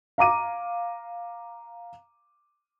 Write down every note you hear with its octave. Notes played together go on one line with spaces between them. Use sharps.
F5 A#5 D6 D#7